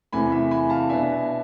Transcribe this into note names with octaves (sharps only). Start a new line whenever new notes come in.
E2 C3 E3 A3 G#5 B5
E5
G#5 B5
F5 A5
B2 B3 D4 E5 G#5